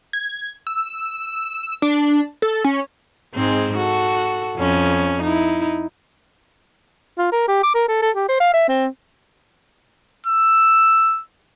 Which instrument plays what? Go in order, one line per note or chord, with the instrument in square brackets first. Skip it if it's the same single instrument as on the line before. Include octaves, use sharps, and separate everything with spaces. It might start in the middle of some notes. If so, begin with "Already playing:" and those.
[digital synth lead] G#6
E6
D4
A4
C#4
[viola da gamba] G#2 G#3 C4
F#4 A4
F2 C#4
D#4 E4
[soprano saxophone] F4
A#4
G4
D6
A#4
A4
A4
G4
C5
F5
E5
C4
[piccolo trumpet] E6